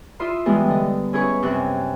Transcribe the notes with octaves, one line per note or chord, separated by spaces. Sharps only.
E4 F4 E5 C6 D#6
E3 G3 G#3 B3
D3 D#5
C#4 E4 G#4 B4 C#6
F#2 C3 F#6